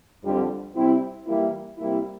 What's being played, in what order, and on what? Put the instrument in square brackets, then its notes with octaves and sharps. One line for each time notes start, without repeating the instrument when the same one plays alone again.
[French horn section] F2 D3 G3
C3 G3 C4 E4
E3 G3 A#3 E4
C3 G3 A#3 E4